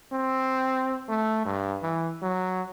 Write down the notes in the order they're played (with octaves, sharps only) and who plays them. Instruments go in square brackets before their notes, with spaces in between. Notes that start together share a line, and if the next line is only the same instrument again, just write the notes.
[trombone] C4
A3
G2
E3
F#3